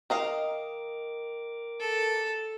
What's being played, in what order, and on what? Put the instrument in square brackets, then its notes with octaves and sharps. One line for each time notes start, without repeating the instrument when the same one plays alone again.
[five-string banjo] D#3 D#5 F5 [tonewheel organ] A#4 D6
[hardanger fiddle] A4